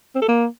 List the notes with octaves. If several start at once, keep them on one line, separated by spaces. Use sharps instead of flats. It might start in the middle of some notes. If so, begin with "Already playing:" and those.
C4
A4
A#3